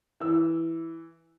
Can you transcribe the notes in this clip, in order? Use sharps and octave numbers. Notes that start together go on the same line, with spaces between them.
E3 E6